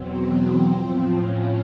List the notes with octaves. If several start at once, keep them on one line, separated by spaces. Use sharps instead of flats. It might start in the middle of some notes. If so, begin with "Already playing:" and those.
Already playing: E2 B2 F#3 C4
A2 F3
C#4